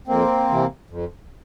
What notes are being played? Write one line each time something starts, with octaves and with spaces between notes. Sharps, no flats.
F2 A#3 C4
C3 E3
F2